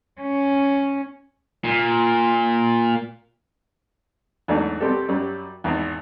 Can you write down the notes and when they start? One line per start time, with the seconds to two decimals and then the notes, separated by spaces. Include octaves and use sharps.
0.21 C#4
1.64 A#2
4.48 E2 G#2 F#3 A3 D4
4.80 B2 G3 C4 G4 A4
5.08 F#2 F#3 G3
5.64 G#1 E2